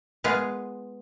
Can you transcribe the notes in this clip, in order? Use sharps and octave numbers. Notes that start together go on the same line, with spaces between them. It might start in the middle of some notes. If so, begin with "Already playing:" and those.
G#3 B3 F4 G#4